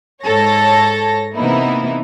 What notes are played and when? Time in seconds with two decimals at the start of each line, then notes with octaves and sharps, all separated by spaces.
0.23 G#2 A4 C#5 A#6
1.36 C3 E3 A#3 B3 D#4 E4